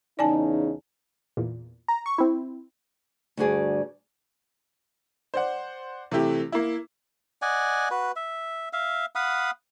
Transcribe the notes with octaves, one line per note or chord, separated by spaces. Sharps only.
E2 C#3 D#4 D5 G#5 A5
E2 A#2
A#5
C#6
C4 E4
D2 G2 F#4 G#4 D5
C5 D5 F#5
C3 E3 A3 E4 G4
A#3 E4
D5 D#5 F#5 G#5
F#4 B4
E5
E5 F5
F5 F#5 B5 D#6